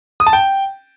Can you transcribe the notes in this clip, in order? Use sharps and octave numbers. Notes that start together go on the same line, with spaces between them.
D#6
A5
G5